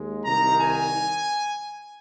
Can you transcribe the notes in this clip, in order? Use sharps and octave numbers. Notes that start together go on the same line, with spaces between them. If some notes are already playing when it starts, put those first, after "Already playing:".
Already playing: D#2 G#3
C2 C3 D#3 A#5
G#5